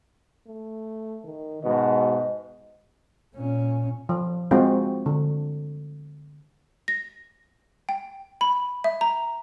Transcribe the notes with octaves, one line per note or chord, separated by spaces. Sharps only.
A3
D#3
G#2 B2 D#5
A#2 C#4
F3
G#3 C4 F4 F#4
D3
A#6
G5
B5
E5
A#5